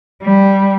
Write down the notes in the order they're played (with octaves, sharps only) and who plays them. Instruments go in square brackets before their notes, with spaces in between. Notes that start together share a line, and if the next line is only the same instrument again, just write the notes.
[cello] G3